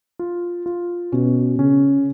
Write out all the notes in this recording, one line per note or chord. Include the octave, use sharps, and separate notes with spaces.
F4
F4
B2 C#4
C#3 C#4